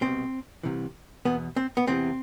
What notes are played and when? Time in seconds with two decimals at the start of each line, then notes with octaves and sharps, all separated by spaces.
0.01 C2 B2 C4
0.63 C2 C3 E3
1.25 E2 B2 B3
1.56 C4
1.77 B3
1.87 E2 C3 E3 C4